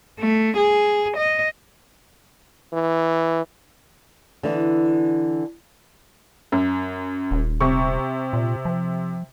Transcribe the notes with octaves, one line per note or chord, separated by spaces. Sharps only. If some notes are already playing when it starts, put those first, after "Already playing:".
A3
G#4
D#5
E3
D3 E3 B3
F#2
D#1
C3 C#6
A#2
F3